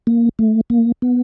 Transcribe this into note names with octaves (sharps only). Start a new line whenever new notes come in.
A#3
A3
A#3
B3